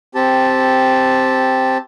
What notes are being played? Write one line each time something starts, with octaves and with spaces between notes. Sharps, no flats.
C4 G4 A5